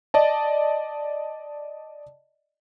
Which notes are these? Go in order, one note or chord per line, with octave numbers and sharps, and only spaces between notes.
D5 D#5 A5